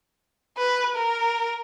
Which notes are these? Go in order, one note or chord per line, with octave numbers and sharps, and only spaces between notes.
B4
A#4